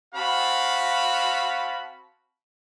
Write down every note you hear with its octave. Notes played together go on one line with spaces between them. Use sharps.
C4 F#4 F5 A5 B5